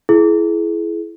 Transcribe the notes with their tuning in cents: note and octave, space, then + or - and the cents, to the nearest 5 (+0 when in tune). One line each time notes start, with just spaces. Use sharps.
E4 +20 G#4 +30